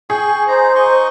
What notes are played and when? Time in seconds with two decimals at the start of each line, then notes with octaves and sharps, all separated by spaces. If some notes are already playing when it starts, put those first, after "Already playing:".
0.10 G#4 G5 C#6
0.48 D#4 C5 A#5
0.75 D#4 D#5 C#6